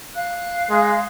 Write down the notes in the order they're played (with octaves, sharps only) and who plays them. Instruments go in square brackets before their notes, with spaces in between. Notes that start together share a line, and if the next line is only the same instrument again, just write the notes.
[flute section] F5 F#6
[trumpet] G#3